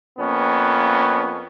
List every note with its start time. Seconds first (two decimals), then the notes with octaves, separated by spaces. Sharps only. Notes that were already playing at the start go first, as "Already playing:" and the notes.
0.18 F2 A#3 B3 C#4